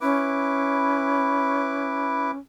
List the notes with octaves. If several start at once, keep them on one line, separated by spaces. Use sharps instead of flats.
C#4 E4 B4 D6